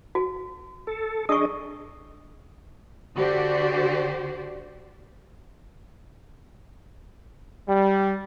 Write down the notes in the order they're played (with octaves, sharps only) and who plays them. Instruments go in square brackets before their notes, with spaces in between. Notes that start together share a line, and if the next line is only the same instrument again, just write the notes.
[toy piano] F#4
[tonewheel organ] A4
[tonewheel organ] D4 G#4 D#5 [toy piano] C#6 D#6
[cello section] D3 F#4 G4 C5 D5
[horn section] G3